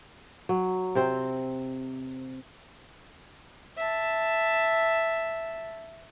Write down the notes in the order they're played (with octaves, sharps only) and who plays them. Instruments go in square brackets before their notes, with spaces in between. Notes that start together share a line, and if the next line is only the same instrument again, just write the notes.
[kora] F#3
C3 C4 C5
[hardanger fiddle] E5 A5